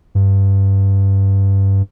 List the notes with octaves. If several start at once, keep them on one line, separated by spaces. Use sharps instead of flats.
G2